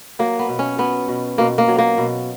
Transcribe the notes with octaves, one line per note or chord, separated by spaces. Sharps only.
F#3 A#3
B3
B2
C#4
F#3 B3
B2
B2 A#3
A#3
F#3
A#3
B2